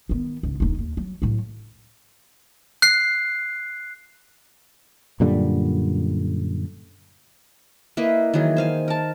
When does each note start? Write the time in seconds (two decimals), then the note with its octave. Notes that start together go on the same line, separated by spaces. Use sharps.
0.09 D#3 B3
0.43 C#2 G#2
0.60 D#1 D#4
0.79 D#2
0.97 F#3
1.22 A2 F#3
2.82 F#6 C7
5.20 F#2 A#2 D3 G3
7.97 A#3 E4 B4 D#5
8.34 D#3 E3 F#3 G#4
8.57 C5 F5 G#5
8.88 A#4 A5